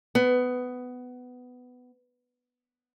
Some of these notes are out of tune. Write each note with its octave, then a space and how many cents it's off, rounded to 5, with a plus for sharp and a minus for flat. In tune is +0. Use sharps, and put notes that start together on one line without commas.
B3 +15